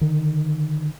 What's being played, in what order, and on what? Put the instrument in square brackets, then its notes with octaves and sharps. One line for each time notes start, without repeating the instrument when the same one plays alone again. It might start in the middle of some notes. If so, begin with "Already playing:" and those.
[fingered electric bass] D3 D#3